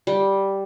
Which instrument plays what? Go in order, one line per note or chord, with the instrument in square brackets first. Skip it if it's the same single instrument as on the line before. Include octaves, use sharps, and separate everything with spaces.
[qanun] G3